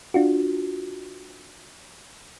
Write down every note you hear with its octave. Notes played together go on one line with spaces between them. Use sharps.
D4 F4 F#4